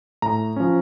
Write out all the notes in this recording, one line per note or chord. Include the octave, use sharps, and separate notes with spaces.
A2 A#5
F3 C#4